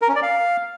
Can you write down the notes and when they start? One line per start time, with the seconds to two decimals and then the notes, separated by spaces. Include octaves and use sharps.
0.02 A#4
0.09 C#4
0.15 D5
0.22 F5